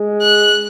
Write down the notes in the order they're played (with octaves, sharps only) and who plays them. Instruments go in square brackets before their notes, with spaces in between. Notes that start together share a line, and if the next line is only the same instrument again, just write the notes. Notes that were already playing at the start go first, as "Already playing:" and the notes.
Already playing: [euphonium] G#3
[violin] F#6